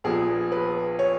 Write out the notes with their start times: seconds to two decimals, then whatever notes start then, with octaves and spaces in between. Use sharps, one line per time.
0.04 A#1 A#2 F3 B3 G#4
0.52 B4
0.99 C#5